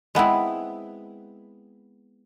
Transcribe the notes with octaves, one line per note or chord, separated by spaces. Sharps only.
G#3 B3 C4 E4